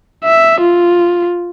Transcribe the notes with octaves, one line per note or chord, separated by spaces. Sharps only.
E5
F4